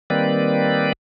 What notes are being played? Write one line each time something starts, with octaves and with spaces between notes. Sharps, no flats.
D#3 G3 A#3 C4 B4 D5